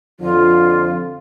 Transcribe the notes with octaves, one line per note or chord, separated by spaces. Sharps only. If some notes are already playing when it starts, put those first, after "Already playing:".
F2 D3 F3 F4